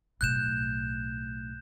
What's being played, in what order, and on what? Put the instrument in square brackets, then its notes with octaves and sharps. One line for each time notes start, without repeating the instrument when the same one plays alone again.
[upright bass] B1 A2 [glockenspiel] F#6 G6 E7